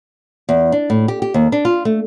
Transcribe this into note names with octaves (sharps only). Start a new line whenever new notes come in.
E2
D4
A2
G4
G4
D#2
D4
F4
A3